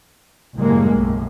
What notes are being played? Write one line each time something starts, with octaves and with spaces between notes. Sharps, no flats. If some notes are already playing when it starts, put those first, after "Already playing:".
F#1 A2 G3 G#3 A#3
B1 F#2 A2